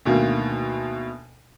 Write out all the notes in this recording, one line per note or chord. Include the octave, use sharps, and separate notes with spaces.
D2 B2 D#3 A#3